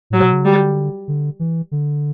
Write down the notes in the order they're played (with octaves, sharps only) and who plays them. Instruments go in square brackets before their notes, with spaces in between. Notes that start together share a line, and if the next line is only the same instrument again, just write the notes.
[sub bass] A2 [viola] F#3
[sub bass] B2
C#3
[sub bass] D3 [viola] G3
[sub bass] D3
E3
D3